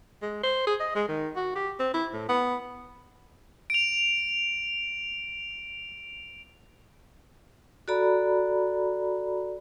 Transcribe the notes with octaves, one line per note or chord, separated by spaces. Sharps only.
G#3
C5
G#4
D#5
G#3
D#3
F#4
G4
C4
E4
A2
B3
D7 F7
F#4 A4 D5 A#5 B5